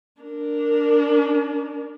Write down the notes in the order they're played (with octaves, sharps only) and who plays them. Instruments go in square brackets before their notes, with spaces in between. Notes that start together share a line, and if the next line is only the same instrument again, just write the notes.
[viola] D4 A#4